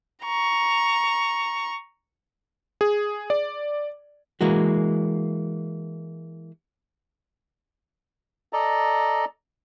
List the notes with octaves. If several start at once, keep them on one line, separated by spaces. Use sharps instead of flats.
A#5 C#6
G#4
D5
E3 G#3 A#3 F#4
A4 D5 D#5 A#5